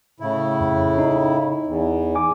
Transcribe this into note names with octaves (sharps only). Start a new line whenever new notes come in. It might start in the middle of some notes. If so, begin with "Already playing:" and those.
A2 C#3 E4
F2
D#4
E2
G#5 D6